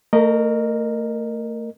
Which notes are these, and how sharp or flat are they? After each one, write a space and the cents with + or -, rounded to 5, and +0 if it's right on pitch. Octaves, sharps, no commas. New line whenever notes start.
A3 +35 A#4 +0 D#5 -25